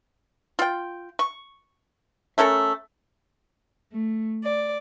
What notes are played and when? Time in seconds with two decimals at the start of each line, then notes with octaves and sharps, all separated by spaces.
0.59 F4 G5
1.19 C#6
2.38 A3 C#4 A4 A#4
3.91 A3
4.43 D5